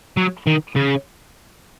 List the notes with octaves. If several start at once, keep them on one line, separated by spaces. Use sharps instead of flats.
F#3
D#3
C#3